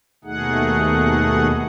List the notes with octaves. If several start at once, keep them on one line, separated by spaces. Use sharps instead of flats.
D#2 B2 A3 D#4 G#4 F#5